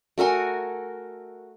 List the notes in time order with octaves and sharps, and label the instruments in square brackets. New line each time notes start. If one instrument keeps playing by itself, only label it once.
[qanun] A3 F#4 A#4 G#5